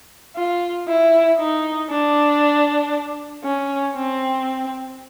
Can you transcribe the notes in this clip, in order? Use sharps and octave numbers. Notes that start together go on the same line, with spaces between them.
F4
E4
D#4
D4
C#4
C4